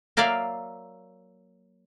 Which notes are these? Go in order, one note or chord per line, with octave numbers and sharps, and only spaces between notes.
F#3 A#3 D5 E5 F5